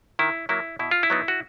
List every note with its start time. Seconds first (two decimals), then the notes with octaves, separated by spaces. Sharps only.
0.19 D#3 E4
0.49 F#3 A#3 E4
0.79 B2 E4
0.91 F4
1.03 E4
1.10 F#3 B3 D#4
1.28 F#4